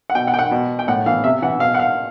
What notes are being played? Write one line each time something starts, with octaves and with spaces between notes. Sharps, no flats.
F#5
B2 G5
F#5
G5
F#5
B2
G5
A2 F#5
E3 F5
C3 E5
E3 F#5
B2 F5
F#5
F5